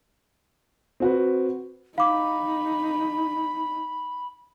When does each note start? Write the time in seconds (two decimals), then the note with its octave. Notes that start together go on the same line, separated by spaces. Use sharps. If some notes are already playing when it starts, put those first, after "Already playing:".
1.00 C4 F#4 B4
1.98 D#4 F5 B5 D6